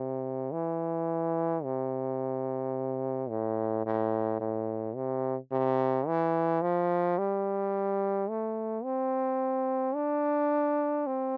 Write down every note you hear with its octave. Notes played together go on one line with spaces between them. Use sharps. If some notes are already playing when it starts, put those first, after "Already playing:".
Already playing: C3
E3
C3
A2
A2
A2
C3
C3
E3
F3
G3
A3
C4
D4
C4